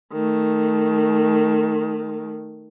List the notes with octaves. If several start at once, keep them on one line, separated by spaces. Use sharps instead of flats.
D#3 A3